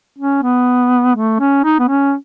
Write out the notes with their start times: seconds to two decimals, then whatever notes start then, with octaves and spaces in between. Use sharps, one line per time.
0.18 C#4
0.43 B3
1.15 A3
1.40 C#4
1.64 D#4
1.80 B3
1.88 C#4